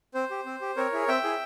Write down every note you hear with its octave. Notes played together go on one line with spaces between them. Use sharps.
C4 C5
G4
C4
G4
C4 A#4 C#5
E4 G#4
C4 E5 G5
E4 G#4